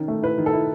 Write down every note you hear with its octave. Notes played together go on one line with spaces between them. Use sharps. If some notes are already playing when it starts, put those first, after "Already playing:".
Already playing: D#3 C#4
A3
E4 B4
D#3
A4
E4